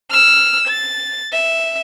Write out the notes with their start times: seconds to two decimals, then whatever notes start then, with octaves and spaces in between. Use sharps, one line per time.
0.10 E6 F6
0.68 A6
1.32 E5